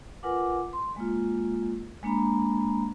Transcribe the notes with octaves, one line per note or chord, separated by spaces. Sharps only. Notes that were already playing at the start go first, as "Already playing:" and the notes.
F4 A#4 B4 F#5 G#5 D6
C6
G#3 A#3 F4
G#3 A#3 D4 A#5 B5